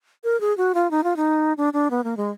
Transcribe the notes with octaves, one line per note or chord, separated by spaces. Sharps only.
A#4
G#4
F#4
F4
D#4
F4
D#4
D4
D4
B3
A#3
G#3